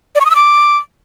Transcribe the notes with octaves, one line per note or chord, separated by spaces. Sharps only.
D5
C#6
D#6
E6
D6